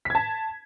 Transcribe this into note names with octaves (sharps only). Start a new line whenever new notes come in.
A5 G#6 B6